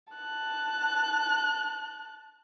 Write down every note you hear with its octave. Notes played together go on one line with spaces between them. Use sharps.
A5 F#6